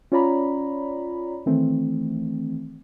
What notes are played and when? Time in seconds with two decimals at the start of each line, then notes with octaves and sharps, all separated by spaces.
0.12 C#4 F4 C#5 D5 A#5 B5
1.46 D#3 E3 A3 C4